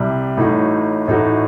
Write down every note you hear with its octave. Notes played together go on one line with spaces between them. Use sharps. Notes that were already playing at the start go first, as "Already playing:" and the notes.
Already playing: C2 C3 G3
A1 A2 A3 D#4 F#4
A1 A2 A3 D#4 F#4